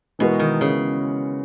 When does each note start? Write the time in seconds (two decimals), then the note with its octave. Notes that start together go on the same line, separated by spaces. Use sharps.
0.19 B2 E3 G#3 B3 F#4 A#4
0.39 D#3
0.61 C#3